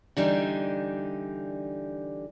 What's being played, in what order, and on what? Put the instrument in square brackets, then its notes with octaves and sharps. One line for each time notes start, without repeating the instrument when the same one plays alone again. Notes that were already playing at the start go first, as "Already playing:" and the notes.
[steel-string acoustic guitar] D3 E3 G3 D4 D#4